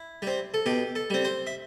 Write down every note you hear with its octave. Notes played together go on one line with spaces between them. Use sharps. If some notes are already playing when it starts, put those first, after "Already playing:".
Already playing: E4
G3 C4
A4
B2 G4
A4
G3 C4
C5
E5